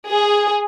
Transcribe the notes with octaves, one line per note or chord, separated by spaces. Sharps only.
G#4